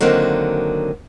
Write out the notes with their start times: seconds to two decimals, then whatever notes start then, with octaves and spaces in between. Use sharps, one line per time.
0.01 D3 D#3 F#3 A#3 C4